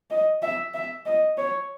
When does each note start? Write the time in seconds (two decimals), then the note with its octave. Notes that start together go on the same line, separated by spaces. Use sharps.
0.10 D#5
0.42 E5
0.74 E5
1.06 D#5
1.38 C#5